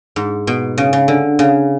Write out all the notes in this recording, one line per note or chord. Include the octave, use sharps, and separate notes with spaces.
G#2
B2
C#3
C#3
D3
C#3